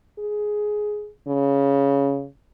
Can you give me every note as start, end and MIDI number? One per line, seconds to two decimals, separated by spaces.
0.19 1.09 68
1.28 2.26 49